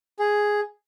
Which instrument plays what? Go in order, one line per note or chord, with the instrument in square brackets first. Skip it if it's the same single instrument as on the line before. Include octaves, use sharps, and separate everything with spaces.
[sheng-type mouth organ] G#4